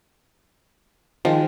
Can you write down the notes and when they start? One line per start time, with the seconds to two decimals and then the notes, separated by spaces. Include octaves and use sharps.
1.25 D#3 F3 G#3